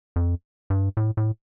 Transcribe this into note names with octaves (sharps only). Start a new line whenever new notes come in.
F2
G2
A2
A2